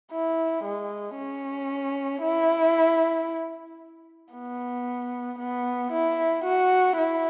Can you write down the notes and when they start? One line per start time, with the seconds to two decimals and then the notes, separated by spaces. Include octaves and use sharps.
0.12 E4
0.64 G#3
1.17 C#4
2.22 E4
4.34 B3
5.40 B3
5.92 E4
6.45 F#4
6.98 E4